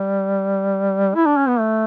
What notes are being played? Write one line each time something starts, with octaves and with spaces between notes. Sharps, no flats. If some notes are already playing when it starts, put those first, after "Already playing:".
Already playing: G3
E4
D4
C#4
B3
A3